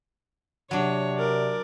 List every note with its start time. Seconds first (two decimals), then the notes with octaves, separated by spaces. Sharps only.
0.71 C3 F#3 D4 C#5
1.18 A#4 D5